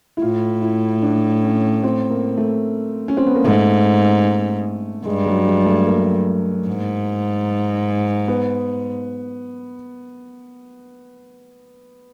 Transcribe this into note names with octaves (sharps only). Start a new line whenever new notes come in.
E4
A2 F4
E4
D4
C#4
C4
A#3
A3
C#4
C4
B3
A#3
G#2 A3
G2 G#3
F#3
G#3
A3
A#3
G#2
B3